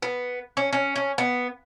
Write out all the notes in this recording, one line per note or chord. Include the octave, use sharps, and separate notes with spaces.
B3
C#4
C#4
C#4
B3